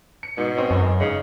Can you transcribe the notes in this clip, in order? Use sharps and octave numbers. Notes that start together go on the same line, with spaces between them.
C#7
G#2 B2
C4 C#4 D#4
F#2
G#2 C#3 D#5